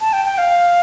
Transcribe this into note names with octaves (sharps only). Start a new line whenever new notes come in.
A5
G5
G5
F5